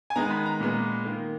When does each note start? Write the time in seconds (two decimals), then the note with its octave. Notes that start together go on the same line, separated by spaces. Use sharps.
0.10 G#5
0.15 D#3 G#3 B3 A#5
0.31 B5
0.46 A#5
0.60 A#2 G#3 B3
1.05 D#3 A#3